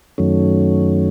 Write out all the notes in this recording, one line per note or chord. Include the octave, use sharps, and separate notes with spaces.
F#2 D#3 F#3 A3 C#4